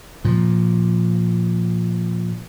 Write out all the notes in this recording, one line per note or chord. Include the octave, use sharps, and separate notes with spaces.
A#2 F3